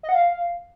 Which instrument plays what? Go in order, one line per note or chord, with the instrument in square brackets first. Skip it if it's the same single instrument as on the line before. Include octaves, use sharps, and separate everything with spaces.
[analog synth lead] D#5
F#5
F5